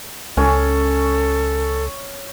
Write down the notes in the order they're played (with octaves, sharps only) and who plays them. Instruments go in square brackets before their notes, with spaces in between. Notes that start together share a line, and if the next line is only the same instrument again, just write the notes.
[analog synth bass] C#2 [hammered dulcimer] C#4 [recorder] A4